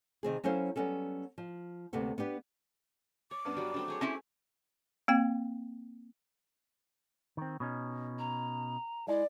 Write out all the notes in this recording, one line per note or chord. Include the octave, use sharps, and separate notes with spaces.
C3 D#3 C4 G#4
F#3 C#4 E4 A4 C5 F5
F#3 G3 B3 C#4 A4
F3
D2 C3 A#3 B3 A4
B3 D4 G4 B4
C#5 D6
G2 B3 D4
F#3 G3
F#3 A3 C4 D4
A3 G#4 C#5
C4 C#4 E4 G#5
A#3 C4 G5
D#3 C4
B2 C#4 D#4
A#5
G#3 E4 D5